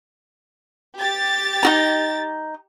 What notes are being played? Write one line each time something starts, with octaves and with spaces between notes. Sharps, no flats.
G4 A6
D#4 F#4 A#5